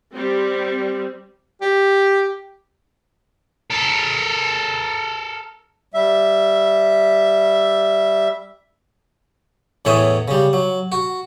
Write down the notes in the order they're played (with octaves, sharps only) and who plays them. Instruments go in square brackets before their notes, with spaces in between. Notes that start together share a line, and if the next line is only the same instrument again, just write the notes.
[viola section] G3 C4
[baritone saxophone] G4
[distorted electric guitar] A4 A#4
[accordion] G3 E5
[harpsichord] E2 A2 E3 C#5 E5 D#6
C#3 G3
F#3
F#4